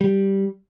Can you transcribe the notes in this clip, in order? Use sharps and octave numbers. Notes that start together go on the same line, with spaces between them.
G3